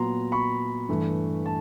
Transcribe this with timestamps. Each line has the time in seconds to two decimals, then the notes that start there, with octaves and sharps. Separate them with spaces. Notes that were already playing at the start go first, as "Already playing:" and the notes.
Already playing: A#2 F#3 B3 A#5 C6
0.32 B5 C#6
0.89 G2 E3 A3
1.46 A5